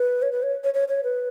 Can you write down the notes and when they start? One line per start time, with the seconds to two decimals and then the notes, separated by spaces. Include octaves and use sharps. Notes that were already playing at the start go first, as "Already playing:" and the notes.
Already playing: B4
0.22 C#5
0.32 B4
0.43 C#5
0.64 C#5
0.74 C#5
0.88 C#5
1.04 B4